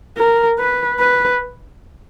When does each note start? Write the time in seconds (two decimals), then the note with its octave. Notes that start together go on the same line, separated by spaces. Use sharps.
0.17 A#4
0.59 B4
1.00 B4